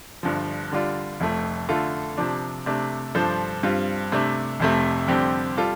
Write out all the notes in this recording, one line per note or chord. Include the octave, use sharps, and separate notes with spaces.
G1 G2 F3
D3 G3 F4 D5
F1 F2 F3 A3
D3 A3 F4 A4
C3 F3 D4
C3 A3 D4
G2 F3 D4 A4 C5
G2 G3 C4 F4
C3 A3 D4
F1 F2 C3 A3
F2 D3 G3 C4 G4
G3 F4 A4